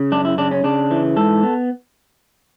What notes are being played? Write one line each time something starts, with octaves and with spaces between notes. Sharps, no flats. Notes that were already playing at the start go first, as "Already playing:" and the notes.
Already playing: C#3
F#2 D4
E4
C#3 D4
C#4
C#3 D4
E3
G#2 A4
B3